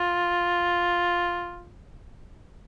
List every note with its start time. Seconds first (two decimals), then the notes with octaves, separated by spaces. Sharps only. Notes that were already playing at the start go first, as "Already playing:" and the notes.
Already playing: F4